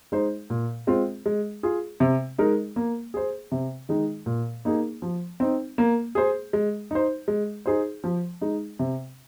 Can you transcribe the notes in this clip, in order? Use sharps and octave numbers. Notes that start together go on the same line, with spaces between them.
G#3 D#4 C5
A#2
G#3 C4 F4
G#3
F4 G#4
C3
G#3 D#4 A#4
A#3
G#4 C5
C3
D#3 G#3 D#4
A#2
A#3 D#4 G#4
F3
C4 D#4
A#3
G#4 C5
G#3
D#4 C5
G#3
D#4 G#4 C5
F3
G#3 D#4
C3